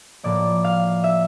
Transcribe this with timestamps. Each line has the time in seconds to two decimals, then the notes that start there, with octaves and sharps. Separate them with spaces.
0.24 A2 F3 A#3 D5
0.64 F5
1.04 E5